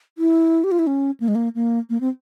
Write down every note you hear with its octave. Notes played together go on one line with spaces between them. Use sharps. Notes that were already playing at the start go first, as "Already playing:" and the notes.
E4
G4
F4
E4
C#4
A#3
G#3
A#3
A#3
A#3
C4